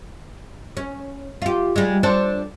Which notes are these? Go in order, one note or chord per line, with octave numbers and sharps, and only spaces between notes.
C#4
F4 G4
G3 G#3
D4 A4 C5